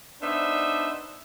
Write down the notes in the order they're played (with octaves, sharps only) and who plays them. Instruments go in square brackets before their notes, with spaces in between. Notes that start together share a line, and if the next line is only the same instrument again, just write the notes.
[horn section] B3 D4 D#4 B4 C5 E5